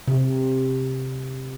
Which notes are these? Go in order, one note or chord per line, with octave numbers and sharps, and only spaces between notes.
C3